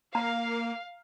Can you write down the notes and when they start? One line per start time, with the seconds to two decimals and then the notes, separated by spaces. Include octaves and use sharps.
0.15 A#3 F5 A#5